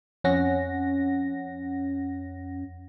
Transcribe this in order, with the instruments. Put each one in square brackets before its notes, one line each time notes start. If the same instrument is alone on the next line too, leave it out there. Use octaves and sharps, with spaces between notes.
[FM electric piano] F2 C#4 F#5 A#6